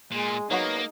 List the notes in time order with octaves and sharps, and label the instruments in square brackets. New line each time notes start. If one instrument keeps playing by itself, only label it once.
[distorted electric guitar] A#2 [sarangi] G#3
[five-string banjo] F#3 B3 F#4 [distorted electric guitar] A#3 [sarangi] D#4